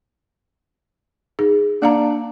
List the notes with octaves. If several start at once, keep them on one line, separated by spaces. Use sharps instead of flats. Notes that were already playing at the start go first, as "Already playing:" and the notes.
D#4 G#4
A#3 D4 F5 A#5